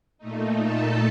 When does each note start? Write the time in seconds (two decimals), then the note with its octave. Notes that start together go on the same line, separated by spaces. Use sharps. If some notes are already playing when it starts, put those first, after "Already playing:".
0.18 A#2 A3 D#4
0.60 A4 A5